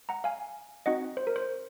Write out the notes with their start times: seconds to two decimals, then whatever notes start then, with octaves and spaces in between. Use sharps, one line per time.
0.09 F#5 A#5
0.24 F5 G#5
0.86 C4 D#4 F#4 D#5 F#5
1.17 C5
1.27 A#4
1.36 C5